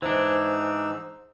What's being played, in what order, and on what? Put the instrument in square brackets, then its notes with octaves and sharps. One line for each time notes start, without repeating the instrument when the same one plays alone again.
[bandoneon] G#2 D#4 E6 [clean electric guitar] E3 D4 [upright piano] C5